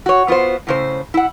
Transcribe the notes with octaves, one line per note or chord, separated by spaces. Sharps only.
F#4 C#5
B3 F4 F#4 C5
A2 C#3 C5
E4 F#5